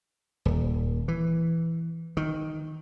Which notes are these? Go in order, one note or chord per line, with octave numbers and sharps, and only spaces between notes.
D#1
E3
D#3